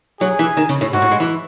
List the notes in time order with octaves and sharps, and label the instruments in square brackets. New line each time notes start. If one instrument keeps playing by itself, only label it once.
[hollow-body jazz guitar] F#3 [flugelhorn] G#4
[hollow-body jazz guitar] E3
D#3
C#3
A2
[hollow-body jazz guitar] G#2 [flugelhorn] F#4
[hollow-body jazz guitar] A2
G#3
E3